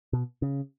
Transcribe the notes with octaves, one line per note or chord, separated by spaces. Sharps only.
B2
C#3